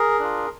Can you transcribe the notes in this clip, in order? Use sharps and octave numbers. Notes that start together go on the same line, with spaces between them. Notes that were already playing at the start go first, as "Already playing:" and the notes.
Already playing: G#4 A#4
D4 F4